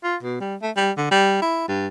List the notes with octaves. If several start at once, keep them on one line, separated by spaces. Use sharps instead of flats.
F4
B2
G3
A3
G3
D3
G3
E4
G2